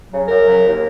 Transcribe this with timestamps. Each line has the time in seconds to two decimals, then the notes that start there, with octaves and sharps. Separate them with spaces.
0.10 C#3 F#3
0.28 F#2 A#4
0.45 C#3 F#3
0.64 D#2